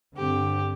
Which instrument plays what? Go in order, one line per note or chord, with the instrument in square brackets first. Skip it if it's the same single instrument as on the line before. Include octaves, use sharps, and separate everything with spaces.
[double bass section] G2 D3 C4 [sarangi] G4